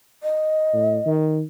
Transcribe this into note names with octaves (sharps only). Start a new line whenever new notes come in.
D#5
A2
D#3